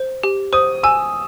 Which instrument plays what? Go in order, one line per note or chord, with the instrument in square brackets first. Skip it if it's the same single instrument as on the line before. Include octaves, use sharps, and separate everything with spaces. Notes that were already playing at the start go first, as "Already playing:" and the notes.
Already playing: [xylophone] C5
G4
[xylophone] C5 [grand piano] D#6
[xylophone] G#5 [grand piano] E6